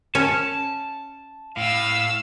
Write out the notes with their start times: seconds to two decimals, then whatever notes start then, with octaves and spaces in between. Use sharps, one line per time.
0.15 C#4 A5
1.57 A2 F5 E6